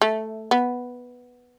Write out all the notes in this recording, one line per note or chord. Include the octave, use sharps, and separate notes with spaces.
A3
B3